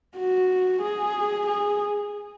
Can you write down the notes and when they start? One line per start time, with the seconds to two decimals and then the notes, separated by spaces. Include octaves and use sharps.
0.16 F#4
0.82 G#4
1.47 G#4